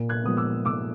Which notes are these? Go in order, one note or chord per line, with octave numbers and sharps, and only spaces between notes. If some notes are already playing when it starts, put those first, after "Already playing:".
Already playing: A#2
F#6 G#6
F3 G#3 B3 D#6
D6 E6
A#2 D6 E6